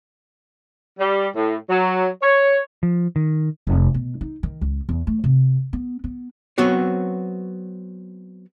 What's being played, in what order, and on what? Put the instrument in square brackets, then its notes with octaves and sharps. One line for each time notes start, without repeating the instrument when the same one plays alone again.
[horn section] G3
A2
F#3
C#5
[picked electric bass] F3
D#3
[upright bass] F1
B2
D#4
D#3
C#2
E2
A3
C3
B3
B3
[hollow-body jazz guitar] F#3 B3 C4 F#4 C#5